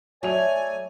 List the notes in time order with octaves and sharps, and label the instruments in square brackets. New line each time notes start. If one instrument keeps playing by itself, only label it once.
[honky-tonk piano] F#3 F7 [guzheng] A3 [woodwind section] C#5 D5 G#5